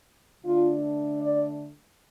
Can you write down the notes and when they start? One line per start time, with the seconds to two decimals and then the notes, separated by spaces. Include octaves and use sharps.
0.43 D3 A3 D4 F4
1.19 D5